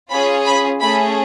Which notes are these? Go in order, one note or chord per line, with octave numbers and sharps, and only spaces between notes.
C#4 F4 G#4 B5
B5
A3 C#4 G#4 B5